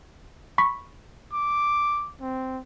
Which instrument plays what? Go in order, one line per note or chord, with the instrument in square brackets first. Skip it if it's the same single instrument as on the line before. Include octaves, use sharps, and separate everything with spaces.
[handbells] B5 C#6 B6
[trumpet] D6
C4